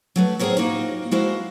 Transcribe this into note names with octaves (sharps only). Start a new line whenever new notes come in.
F#3 A3 B4
A2 C4 G#4 A#4 C5 C#5
A#3 D#4 F4 F#4
G#3 E4 F#4 A#4 C5 F5